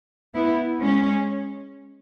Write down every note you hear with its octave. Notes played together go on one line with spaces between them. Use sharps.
B3 E4
G#3 C#4